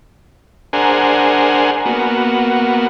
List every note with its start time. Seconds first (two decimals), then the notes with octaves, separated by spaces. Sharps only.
0.73 D4 G#4 A#4 C5 F#5 G#5
1.86 A#3 B3 F#4